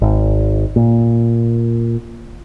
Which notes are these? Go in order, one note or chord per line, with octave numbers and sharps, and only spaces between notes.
G#1
A#2